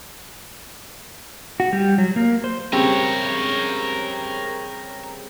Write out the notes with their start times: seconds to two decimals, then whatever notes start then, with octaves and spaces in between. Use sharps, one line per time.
1.60 F#4
1.73 G3
1.98 F#3
2.16 A#3
2.44 C5
2.73 C#3 G3 C4 A#4 C#5